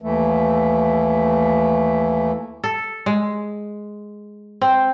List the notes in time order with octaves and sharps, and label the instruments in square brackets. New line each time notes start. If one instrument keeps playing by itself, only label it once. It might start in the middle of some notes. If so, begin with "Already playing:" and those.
[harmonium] D#2 E3 A3
[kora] A4
G#3
C4